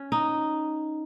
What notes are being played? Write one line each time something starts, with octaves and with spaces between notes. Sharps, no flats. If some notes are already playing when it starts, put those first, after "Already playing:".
Already playing: C#4
D#4